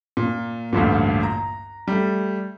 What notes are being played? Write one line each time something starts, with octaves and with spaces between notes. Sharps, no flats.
A#2
A1 D2 G2 A#2
A#5
G3 A3